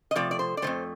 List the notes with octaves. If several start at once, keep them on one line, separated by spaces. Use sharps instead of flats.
D#5
C3 F3 A3 D5
D5
C5
D5
F2 D#3 A3 C5